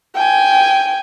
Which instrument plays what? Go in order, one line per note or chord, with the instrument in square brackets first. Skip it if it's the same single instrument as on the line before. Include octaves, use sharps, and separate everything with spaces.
[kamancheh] G5 G#5